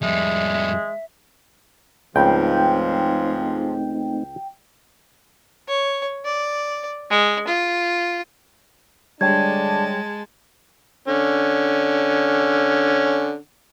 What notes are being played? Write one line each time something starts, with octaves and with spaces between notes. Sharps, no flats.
F2 G3 G#3 E5
C#2 G#2 C#3 F3 A3 C4 D#4 G5
C#5
D5
G#3
F4
D3 G3 G#3 D4 C#5 G5 A5 G#6
D3 C#4